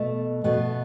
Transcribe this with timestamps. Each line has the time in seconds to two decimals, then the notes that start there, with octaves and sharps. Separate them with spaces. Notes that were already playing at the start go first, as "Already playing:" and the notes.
Already playing: B2 A3
0.44 B2 A3 B3